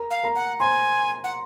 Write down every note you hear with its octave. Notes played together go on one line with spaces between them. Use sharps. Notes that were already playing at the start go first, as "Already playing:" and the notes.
Already playing: A#4 A#5
F5
A#4 A#5
F#5
C5 G#5 C6
F#5